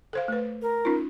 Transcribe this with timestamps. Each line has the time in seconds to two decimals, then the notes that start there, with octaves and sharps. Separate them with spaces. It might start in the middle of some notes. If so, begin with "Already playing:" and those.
0.13 A4 C5 F5
0.28 A3 B4
0.62 A#4
0.85 C#4 D#4 F4